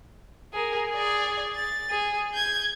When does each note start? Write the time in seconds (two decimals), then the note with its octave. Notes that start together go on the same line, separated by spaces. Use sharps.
0.54 G#4 A#4
0.90 G#4 D5
1.55 A6
1.90 G#4
2.34 G6 G#6